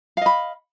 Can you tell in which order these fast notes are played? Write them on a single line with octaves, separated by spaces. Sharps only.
F5 D#5 B5